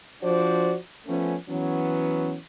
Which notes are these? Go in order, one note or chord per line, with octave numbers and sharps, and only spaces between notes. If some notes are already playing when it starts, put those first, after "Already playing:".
F3 D4 F#4 C5 D5
F3 A3 B3 C#4
E3 F#3 B3 C#4